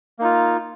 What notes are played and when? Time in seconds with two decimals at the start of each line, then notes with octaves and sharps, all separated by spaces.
0.19 A#3
0.22 D#4
0.24 F4